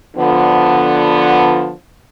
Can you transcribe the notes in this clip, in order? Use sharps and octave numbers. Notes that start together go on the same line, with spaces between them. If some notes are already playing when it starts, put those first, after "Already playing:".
D3 F3 B3